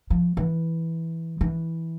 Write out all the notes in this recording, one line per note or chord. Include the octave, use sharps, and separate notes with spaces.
F3
E3
E3